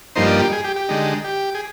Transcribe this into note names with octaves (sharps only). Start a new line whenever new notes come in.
G2 F3 A#3 D#4 C5
D5
G4
G#4
G4
G4
D3 G#3 D#4
G4
G#4